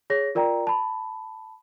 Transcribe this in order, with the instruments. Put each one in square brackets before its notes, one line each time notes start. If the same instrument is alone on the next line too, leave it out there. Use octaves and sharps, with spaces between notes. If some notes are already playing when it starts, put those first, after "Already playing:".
[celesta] G#4 C#5 A#6
F4 A#4 D5 G5 A#5
A5 B5